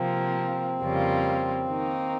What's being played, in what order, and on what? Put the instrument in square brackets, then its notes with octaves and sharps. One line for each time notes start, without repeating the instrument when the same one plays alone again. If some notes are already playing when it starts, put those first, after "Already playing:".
Already playing: [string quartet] C3 F3 A#3 [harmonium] C4
[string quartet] F2 C#3 G3 A#3 F4
D#3 A#3 D#4